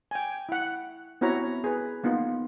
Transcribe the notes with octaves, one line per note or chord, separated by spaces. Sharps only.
G5 G#5
E4 F#5
B3 C4 E4 F#4 C#5 A#5
G#4 B4
A#3 B3 D#4 F4